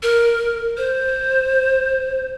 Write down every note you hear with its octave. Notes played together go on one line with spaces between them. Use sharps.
A#4
C5